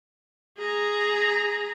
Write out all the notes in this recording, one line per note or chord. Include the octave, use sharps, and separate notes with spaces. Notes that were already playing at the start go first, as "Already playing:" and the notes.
G#4 A#5